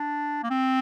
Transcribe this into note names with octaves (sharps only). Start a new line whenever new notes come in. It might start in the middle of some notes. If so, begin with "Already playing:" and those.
Already playing: D4
A#3
C4